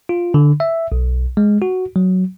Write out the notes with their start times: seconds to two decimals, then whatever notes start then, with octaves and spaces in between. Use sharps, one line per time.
0.09 F4
0.34 D3
0.60 E5
0.92 B1
1.37 G#3
1.62 F#4
1.96 F#3